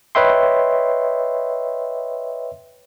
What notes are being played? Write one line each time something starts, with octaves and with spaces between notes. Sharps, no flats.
B4 C#5 D#5 E5 G5 C6